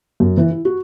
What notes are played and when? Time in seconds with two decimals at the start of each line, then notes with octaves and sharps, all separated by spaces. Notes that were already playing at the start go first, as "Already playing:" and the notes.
0.20 F#2
0.37 E3
0.51 E4
0.65 F#4